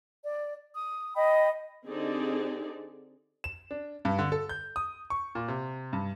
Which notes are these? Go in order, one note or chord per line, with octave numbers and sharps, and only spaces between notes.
D5
D#6
D#5 G5 B5 D#6
D3 C4 D#4 G4 G#4 D5
E7
D4
G2
D3
A4
G6
D#6
C#6
A#2
C3
G2